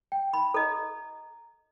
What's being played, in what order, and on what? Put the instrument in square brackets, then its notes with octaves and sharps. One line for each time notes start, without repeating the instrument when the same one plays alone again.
[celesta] G5
[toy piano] B5
[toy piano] A4 D#5 [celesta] A#5